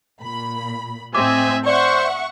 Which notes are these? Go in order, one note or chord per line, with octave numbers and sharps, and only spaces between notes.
A#2 B5
A2 C4 D#5 E5 G#5 D6
C5 D5 E5 F#5 C#6